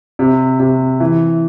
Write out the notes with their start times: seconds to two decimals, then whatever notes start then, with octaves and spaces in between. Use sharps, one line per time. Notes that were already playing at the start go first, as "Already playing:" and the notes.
0.19 C3
0.60 C3
1.00 E3